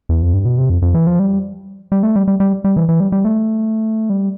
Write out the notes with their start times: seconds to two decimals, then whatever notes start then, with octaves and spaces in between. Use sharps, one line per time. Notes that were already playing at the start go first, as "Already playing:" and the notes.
0.09 E2
0.22 F2
0.34 G2
0.45 B2
0.58 C3
0.70 F2
0.82 F2
0.94 E3
1.07 F3
1.19 G3
1.92 G3
2.03 A3
2.16 G3
2.28 G3
2.40 G3
2.64 G3
2.76 E3
2.89 E3
3.00 G3
3.12 G3
3.25 A3
4.10 G3